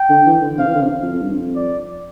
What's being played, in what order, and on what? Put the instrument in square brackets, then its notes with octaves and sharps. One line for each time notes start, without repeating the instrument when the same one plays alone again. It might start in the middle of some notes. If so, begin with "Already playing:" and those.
Already playing: [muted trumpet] G5
[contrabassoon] D3
E3
D3
[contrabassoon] C3 [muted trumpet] F5
[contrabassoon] E3
D3
C3
F2
F2
G2
F2
[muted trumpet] D5